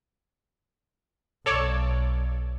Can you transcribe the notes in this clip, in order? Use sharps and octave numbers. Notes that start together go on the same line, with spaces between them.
B1 A4 C#5 D5